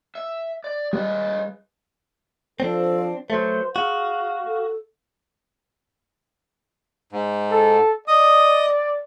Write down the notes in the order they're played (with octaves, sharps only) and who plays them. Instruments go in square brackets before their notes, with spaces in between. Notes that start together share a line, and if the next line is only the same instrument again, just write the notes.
[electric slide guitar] E5
D5
[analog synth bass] G3 [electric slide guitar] G#4 B4 D#5
[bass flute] F3 [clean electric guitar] C4 D4 [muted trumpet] A4
[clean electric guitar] F#3 A3 [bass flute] B4 [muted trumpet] C5
[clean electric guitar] F#4 [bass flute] G#4 [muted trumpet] F5
[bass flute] A4
[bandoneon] G#2
[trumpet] A4
[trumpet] D5 [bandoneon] D#5 D#6